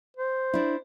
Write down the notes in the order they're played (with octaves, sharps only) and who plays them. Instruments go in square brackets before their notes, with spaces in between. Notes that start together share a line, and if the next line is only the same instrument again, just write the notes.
[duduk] C5
[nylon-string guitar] D4 E4